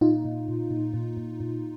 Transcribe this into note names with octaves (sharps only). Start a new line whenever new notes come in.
A#2 D#4 F4
A#2
A#2
A#2
A#2
A#2
A#2